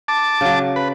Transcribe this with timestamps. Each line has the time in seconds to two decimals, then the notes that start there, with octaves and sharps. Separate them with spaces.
0.08 A5 D6
0.41 C#3 F#3
0.76 B4